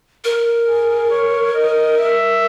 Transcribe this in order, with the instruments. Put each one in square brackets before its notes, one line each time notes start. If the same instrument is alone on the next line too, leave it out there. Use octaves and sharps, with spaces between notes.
[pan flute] A#4
[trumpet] G#4
C#5
D#5
E5